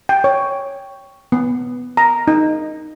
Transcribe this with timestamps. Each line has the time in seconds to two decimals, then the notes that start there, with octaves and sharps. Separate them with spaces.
0.09 G5
0.24 C#5
1.32 B3
1.97 A#5
2.28 D#4